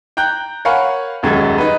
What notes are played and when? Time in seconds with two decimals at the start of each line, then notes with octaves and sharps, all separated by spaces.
0.17 G5 A#5 F#6 G6
0.65 A#4 C#5 F5 F#5 G#5 B5
1.23 D#1 F#2 G#3 G#6
1.58 D#4 B4